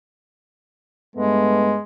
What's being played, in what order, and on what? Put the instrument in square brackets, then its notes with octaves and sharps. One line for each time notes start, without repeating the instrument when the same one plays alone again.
[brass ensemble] G2 A3 B3 [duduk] G#3